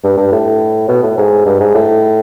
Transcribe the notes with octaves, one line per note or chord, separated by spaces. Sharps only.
G2
G2
A2
B2
A2
G#2
G2
G#2
A2